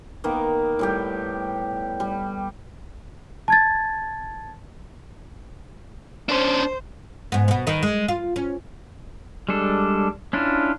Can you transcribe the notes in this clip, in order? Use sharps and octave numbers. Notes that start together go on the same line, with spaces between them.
D#3 A#3 B3
A2 G3 G4
G3
A5 G#6 A6
C#4 D4 C5
G#2 B3
B2 B3
D#3 D#4 B4
G#3
F4
C#4
G3 G#3 D4 A4
C#4 D4 E4 F4